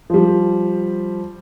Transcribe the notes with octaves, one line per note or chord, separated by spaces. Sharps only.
F3 G3